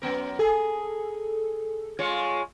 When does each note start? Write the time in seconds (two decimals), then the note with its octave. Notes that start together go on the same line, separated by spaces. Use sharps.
0.02 F#2 B3 A#4
0.39 G#4 A4
1.99 G#3 F4 C#5